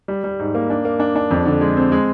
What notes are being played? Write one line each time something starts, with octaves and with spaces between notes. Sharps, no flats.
G3
G3
G#2
A#3
D4
A#3
D4
D4
F2
D3
G#3
C4
G#3